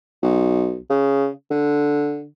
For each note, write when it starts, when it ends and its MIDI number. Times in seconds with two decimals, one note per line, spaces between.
0.23 0.80 35
0.90 1.29 49
1.51 2.26 50